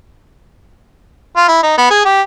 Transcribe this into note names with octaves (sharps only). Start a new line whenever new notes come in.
F4
E4
D#4
B3
G#4
G4